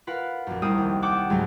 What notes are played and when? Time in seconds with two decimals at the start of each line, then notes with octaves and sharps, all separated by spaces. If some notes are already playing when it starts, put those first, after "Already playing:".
0.07 F4 A#4 B4 F5 F#5
0.47 A#1 F#2
0.62 F1 C2 C4 A#4 D#6 D#7
0.78 D#2
1.02 F#5 G5 A5 D6
1.30 C#2 G#2 F#3